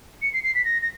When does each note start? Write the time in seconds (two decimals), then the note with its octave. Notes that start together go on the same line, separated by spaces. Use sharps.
0.22 C#7
0.34 C7
0.44 C7
0.55 B6
0.65 A#6
0.82 A#6